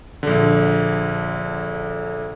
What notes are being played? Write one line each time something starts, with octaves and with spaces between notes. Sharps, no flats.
A#1 D3